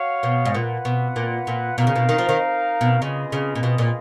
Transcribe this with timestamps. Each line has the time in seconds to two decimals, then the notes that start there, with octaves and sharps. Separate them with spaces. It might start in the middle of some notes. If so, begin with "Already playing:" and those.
Already playing: F#4 C#5 F5
0.23 B2
0.45 G#2
0.54 A#2 F4 B4 F#5
0.85 B2
1.16 A#2
1.47 A#2
1.78 B2 D#4 A#4 F5
1.87 C#3
1.96 B2
2.09 D#3
2.18 F3
2.29 D#3
2.81 B2
3.01 C#3 A#3 F4 G#4 B4 D#5
3.32 C#3
3.55 A#2
3.63 B2
3.78 A#2